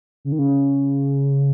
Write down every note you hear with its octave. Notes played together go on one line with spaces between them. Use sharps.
C#3
D#3
C#3